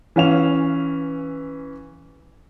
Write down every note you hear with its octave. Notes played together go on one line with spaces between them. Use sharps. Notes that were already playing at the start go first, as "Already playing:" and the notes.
E3 C#4 F5 F7